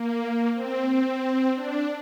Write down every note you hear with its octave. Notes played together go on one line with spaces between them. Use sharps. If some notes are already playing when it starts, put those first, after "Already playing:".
Already playing: A#3
C4
C4
D4